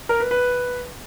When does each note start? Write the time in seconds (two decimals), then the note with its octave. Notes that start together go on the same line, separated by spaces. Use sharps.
0.09 A#4
0.20 B4
0.31 B4